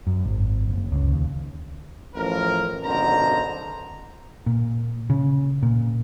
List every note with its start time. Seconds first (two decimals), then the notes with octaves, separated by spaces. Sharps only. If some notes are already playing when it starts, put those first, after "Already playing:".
0.07 F#2
0.25 G#1
0.68 F#1
0.92 C#2
1.13 D#2
2.15 A1 F3 A#4
2.84 G#1 F#2 B2 D3 C5 A#5
4.46 A#2
5.10 C#3
5.63 A#2